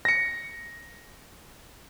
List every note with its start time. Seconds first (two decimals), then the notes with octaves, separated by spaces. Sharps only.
0.05 A#6 C#7